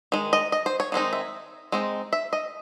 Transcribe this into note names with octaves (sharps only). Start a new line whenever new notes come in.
D#3 G#3
D#5
D#5
C5
C#5
D#3 G#3 C4 D#4
E5
G#3 C4 D#4
E5
D#5